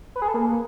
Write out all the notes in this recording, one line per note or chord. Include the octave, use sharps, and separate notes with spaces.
B4
G#4
A4
A#3